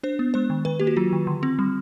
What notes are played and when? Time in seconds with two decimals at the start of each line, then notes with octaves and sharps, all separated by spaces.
0.03 D4 C5
0.19 B3
0.34 G#3 C5
0.50 D#3
0.65 D#3 B4
0.80 A#3 G4
0.87 F#4
0.97 F#3 F4
1.13 D#3
1.27 D3
1.43 C4
1.59 G3